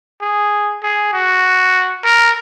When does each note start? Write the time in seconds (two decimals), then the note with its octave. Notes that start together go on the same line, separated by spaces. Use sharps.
0.21 G#4
0.82 G#4
1.13 F#4
2.04 A#4